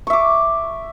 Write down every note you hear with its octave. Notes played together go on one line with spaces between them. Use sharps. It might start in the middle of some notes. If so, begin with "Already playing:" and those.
E5 C#6 D6